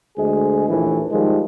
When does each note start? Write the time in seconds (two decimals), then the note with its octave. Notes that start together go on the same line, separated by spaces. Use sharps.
0.18 D2 G#3 G#4
0.69 A#1 D#2 A2 E3
1.12 D#3 F3 G3 G#3